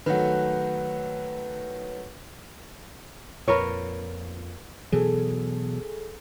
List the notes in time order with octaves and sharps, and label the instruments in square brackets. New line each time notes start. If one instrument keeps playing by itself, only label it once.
[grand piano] D#3 F#3 A3 [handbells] B4 F#5
[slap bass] F2 A#2 [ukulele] A#4 B4 C#5
[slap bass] B2 E3 F#3 [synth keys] G#4 A4